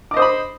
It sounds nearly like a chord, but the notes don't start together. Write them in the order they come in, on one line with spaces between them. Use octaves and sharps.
D6 D#5 C5 D#6 B5